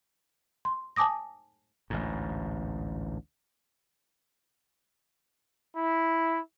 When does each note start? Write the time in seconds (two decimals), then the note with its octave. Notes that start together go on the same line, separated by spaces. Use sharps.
0.65 C6
0.96 G#5 A5 D6 D#6 A#6
1.90 A1 D2 G#2
5.75 E4